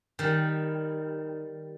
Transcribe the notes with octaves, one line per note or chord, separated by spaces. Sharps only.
D#3 G3